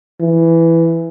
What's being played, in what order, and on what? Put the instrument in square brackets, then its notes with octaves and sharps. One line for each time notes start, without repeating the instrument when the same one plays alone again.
[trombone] E3